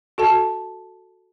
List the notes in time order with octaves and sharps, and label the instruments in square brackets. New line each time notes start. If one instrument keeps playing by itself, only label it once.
[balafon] F#4 A4 A5